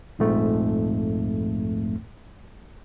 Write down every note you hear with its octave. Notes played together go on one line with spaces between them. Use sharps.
A#1 F2 G#2 A3